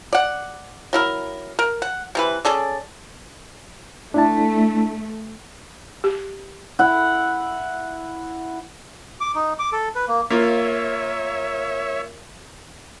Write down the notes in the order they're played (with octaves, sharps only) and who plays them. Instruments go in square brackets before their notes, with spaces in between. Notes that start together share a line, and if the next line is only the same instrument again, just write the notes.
[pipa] D5 F#5
F#3 E4 A#4
A#4
F#5
C3 E3 B4
C#4 G#4 A4 D5
[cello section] A3 [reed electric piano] D4 E4 A5
[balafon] G4
[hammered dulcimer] E4 F#5
[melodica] D6
D#4
D6
A4
B4
A#3
[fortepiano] A#3 F4 [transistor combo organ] C#5 E5